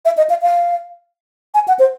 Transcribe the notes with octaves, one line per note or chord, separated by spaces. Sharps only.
E5
D#5
F5
F5
G#5
F#5
C5